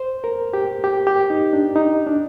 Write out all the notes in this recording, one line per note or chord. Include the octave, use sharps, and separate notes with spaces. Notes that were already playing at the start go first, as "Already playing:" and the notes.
Already playing: C5
A#4
G4
G4
G4
D#4
D4
D#4
D4